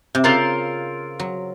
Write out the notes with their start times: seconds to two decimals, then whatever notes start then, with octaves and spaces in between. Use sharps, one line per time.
0.15 C3
0.24 C#3 C4 F4 A#4
1.20 F#3